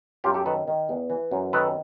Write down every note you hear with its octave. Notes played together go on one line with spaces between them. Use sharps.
F#2 F4 G4
G4 A4
D#3 A4 B4
D#3
E2
E3
F#2
D#3 A4 B4